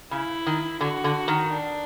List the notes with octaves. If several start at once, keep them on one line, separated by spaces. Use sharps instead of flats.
C#3 E4
D#3
D3 F#4
D3
D#3
D4